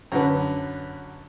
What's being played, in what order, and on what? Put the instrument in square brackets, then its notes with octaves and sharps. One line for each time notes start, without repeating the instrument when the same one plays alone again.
[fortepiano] F#2 D3 B4